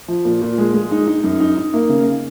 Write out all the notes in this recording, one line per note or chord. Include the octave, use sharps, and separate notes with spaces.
F3
A#2
A#2
G#3
G#3
D#4
D#4
F#2
D#4
D#4
A#3
C#3